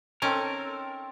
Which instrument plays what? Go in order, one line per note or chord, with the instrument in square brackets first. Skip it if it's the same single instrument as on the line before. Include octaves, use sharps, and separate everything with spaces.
[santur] C4 A4 [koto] C#4 D#4 [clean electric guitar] A#4